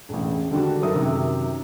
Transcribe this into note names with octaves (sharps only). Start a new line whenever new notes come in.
E1 A1
D3 D#3 G3 D4 F#4
F#1 D#4 A4 A#4 E5 D#6
F#2 C3 D#3 F#3